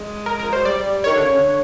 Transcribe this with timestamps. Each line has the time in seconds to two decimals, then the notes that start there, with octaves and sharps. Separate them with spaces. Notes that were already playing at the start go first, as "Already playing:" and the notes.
Already playing: G#3
0.26 A#4
0.39 F3 A#4
0.52 F#3 C5
0.65 G3 D5
1.04 D#3 C#5
1.14 D3
1.23 C#3
1.32 D3